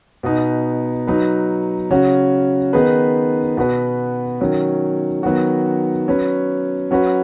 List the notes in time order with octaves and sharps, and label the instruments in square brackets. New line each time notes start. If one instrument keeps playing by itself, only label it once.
[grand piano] B2 B3 D#4
F#3 D#4 B4
C#3 F#3 C#4 F#4
D#3 B3 D#4 G#4 B4
B2 B3 F#4 B4
D#3 F#3 C#4
D#3 F#3 B3 F#4
F#3 C#4 B4
F#3 C#4 F#4 B4